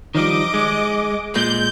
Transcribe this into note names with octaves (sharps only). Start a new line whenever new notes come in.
D#3 F3 G3 D#5 D6
G#3
A#2 G#3 G6